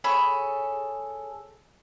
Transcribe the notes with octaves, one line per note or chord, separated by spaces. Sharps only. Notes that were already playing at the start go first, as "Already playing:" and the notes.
G#4 A4 C#5 B5